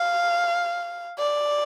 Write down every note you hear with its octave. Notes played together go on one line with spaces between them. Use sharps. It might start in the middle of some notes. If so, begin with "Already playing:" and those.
Already playing: F5
D5